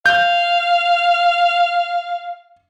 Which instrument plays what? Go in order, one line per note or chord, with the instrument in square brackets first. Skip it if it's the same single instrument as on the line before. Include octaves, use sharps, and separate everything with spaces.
[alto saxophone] F5 [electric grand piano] G6